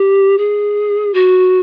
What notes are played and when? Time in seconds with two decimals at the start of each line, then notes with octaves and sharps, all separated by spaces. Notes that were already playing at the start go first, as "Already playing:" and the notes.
Already playing: G4
0.38 G#4
1.14 F#4